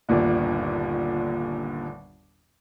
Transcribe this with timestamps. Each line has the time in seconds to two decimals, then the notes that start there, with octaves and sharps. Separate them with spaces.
0.09 G1 D#2 A#2 D3